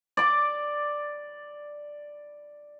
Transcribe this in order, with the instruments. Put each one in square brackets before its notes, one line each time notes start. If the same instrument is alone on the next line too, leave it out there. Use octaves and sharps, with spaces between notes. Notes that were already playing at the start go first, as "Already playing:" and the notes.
[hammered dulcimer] D5 D6